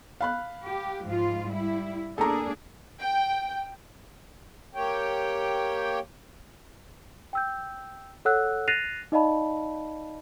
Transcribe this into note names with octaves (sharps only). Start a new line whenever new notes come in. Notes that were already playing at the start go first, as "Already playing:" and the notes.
F5 B5 F#6
G4
G#2 F3 F4
G3 E4
A#3 D4 G#4 A4 A#5
G5
A#3 G4 C#5 G5
G5 E6 G6
A4 C#5 F#5 E6 F#6
F#6 A6 A#6 C7 D#7 F7
D#4 D5 D#5 F5 A5 B5